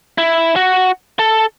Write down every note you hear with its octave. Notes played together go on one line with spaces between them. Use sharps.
E4
F#4
A4